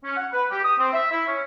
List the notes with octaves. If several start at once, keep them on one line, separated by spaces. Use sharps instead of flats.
C#4
F#5
B4
G4
D#6
C4
E5
E4
C#4